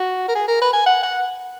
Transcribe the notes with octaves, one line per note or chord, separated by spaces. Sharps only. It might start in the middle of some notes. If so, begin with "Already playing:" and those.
Already playing: F#4
A#4
G#4
A#4
B4
G#5
F#5
F#5